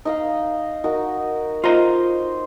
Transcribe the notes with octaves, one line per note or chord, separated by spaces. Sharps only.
D#4 D#5 F5
D#4 F#4 A#4
F4 C5 D#5 A#5